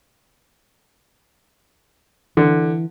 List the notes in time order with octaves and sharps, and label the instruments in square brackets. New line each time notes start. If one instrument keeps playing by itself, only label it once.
[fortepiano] D3 [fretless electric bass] E3